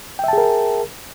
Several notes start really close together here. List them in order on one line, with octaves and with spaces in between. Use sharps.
G5 E5 A5 G#4 A#4